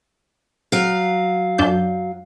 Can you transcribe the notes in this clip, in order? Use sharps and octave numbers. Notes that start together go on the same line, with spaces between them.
F#3 F5
F#2 D4 G6